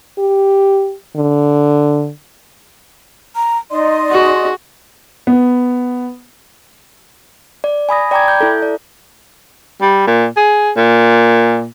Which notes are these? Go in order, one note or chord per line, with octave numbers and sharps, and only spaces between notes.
G4
D3
A#5
D#4 D5 D#5 C6
F#4 G#4
B3
D5
G#5 B5 D#6 A#6
D5 G5 A#5 B5 D6 G#6
G6
E4 A4
D5
G3
A#2
G#4
A#2